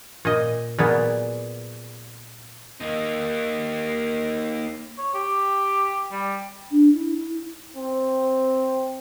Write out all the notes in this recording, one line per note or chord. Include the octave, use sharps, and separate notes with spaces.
A#2 D#5
A#2 F#3 B3 G#4 B4 D5
A#3 D#4
C#5
G4
G3
D4
E4
E4
C4